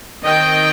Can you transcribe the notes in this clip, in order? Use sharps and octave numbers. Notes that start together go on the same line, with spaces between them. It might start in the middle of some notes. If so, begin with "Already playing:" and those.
D#3 C4 D#5 G5